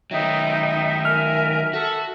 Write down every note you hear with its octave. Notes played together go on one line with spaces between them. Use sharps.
D#3 F#3 D#4 E5 G5
A#4 G#5 F6
F#4 A4